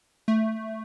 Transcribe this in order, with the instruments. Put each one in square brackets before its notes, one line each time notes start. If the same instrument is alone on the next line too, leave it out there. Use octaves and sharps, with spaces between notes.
[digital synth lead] A3